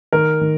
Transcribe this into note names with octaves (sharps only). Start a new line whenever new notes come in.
D#3 A#4
D#3